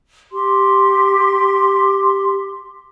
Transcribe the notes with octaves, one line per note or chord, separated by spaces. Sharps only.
G4 C6